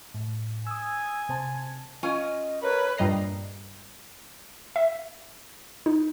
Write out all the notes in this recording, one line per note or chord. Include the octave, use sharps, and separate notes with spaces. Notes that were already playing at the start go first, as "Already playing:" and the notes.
A2
G#5 D#6 E6
C3 C5 A5
C#4 F4 D#5 G#5
A#4 B4 C#5
G2 A#2 G3 D#5 A#5 C7
E5
D#4